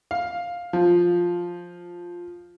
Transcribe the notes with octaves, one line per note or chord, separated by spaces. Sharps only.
F5
F3